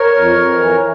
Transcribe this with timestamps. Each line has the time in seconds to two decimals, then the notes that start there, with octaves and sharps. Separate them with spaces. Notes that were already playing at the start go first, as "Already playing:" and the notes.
Already playing: A#4 C#5
0.15 F2
0.37 F2
0.58 E3